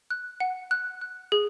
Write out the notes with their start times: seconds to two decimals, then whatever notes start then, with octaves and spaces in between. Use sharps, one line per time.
0.10 F#6
0.40 F#5
0.71 F#6
1.01 F#6
1.32 G#4